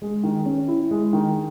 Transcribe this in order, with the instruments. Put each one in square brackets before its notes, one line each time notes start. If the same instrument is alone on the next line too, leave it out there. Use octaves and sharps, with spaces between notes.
[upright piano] G#3
D#3
C#4
E4
G#3
D#3